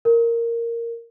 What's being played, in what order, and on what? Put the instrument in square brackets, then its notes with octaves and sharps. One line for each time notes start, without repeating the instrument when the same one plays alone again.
[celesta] A#4